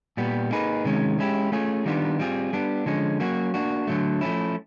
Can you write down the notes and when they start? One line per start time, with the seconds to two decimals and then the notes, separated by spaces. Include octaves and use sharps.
0.17 A#2 G3 B3
0.51 A#3 D#4 G#4 B4
0.85 C3 D#3 G#3 C#4
1.19 G#3 C#4 E4 G4
1.52 A3 C#4 F4 G#4
1.86 D#3 G3 B3 D4 F4
2.19 G3 C4 F4 G#4
2.53 G3 B3 D4
2.86 D3 F3 G#3 C#4
3.20 F#3 A#3 C#4 F#4
3.54 A#3 D4 F#4
3.87 D3 F#3 A3
4.21 F3 A3 C#4 E4